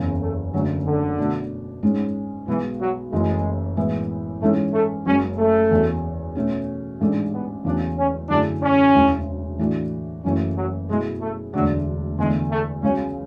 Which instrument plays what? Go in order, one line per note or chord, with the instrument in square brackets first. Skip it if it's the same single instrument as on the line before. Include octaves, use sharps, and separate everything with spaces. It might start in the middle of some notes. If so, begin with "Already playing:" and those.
Already playing: [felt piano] F#1 E2 C#3
[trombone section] A3
[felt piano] F#1 F#2 D3 A3 [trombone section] F#3
[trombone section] D3
[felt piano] B2 A3 D4
G#2 G#3 C#4
[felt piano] B1 B2 G#3 B3 [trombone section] E3
[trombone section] F#3
[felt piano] F#1 F#2 E3 A3 [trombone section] G#3
[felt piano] A2 E3 G#3 B3 E4
[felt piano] G#2 E3 G#3 C#4 [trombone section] A3
[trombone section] A3
[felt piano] F#1 F#2 C#3 G#3 [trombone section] C#4
[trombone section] A3
[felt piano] E2 C#3 F#3
B2 A3 C#4 F#4
[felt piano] A1 G#2 G#3 D4 [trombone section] A3
[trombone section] B3
[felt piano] E2 C#3 F#3 A3 [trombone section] D4
[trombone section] C#4
[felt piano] F#2 D3 A3 E4 G#4 [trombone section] D4
[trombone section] C#4
[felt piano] E1 D2 C#3 E3
A2 E3 A3 D4 F#4
[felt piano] F#1 F#2 E3 A3 [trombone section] C#4
[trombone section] F#3
[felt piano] B2 F#3 A3 E4 G#4 [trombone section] G#3
[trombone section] A3
[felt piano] E1 D2 D3 A3 D4 [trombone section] F#3
[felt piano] E2 D3 A3 [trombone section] G#3
[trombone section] A3
[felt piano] C#2 C#3 F#3 [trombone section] C#4